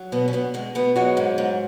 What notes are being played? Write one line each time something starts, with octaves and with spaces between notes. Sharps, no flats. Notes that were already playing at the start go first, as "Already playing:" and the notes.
Already playing: F#3
B2 B3
C#4
B2 B3
B2 G#3
B2 B3
F#3 G#3 F#4
G#2
G#2